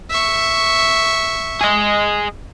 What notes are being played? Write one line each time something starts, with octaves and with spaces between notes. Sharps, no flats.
E5 C#6
G#4 D#5